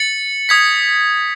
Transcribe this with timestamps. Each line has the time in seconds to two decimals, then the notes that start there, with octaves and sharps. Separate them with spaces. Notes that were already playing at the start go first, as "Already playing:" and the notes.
Already playing: A6 C#7 F#7
0.49 D#6 G#6 B6